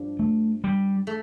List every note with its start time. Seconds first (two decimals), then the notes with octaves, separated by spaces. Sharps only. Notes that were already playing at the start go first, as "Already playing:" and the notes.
Already playing: G2 F3 D4
0.19 A3
0.64 G3
1.07 A3